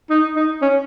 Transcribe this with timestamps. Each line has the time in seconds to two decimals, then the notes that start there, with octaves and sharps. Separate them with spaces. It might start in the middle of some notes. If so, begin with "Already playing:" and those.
0.10 D#4
0.36 D#4
0.62 C#4